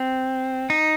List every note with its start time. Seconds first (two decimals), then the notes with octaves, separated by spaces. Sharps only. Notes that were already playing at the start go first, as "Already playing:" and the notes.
Already playing: C4
0.70 D#4